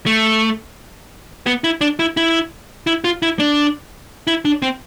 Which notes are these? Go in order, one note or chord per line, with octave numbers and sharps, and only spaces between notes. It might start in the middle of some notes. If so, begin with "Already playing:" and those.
A3
B3
E4
D4
E4
E4
E4
F4
E4
D4
E4
D4
C4